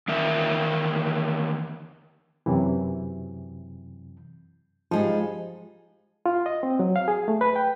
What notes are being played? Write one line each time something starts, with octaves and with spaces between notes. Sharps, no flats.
E2 D#3 A#4 E5
F#2 C3 E3
F3 G3 G#3 D#4
F4
D#5
C4
F#3
F5
G#4
A3
B4
G5